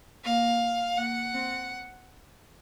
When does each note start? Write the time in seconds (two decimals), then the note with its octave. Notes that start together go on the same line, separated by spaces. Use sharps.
0.24 A#3 F5
0.97 A#3 F#5
1.34 C4